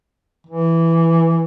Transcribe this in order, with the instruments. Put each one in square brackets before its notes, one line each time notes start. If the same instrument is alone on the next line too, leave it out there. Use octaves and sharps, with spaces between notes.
[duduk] E3